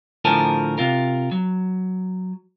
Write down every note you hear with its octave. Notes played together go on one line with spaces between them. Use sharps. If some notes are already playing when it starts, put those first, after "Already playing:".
A2 D3 F3 A#4 G#5 A5
C3 F4 A#4
F#3